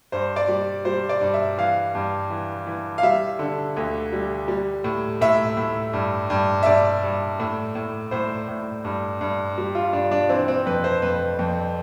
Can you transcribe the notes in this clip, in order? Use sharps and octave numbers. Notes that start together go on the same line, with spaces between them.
G2 C5
D5
G3
G3 C5
D5
G2
E5
E3 F5
G2
E3
E3
F5
G3 E5
D3
D2
G3
G3
A2
A2 E5
A2
G2
G2
E5
G2 D5
G2
A2
A2
A2 C5
A2
G2
G2
G3
F4
G2 D4
D4
E3 C4
C4
F2 B4
C5
F2 B4
F2